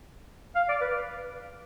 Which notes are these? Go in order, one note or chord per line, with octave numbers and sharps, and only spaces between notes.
F5
D5
B4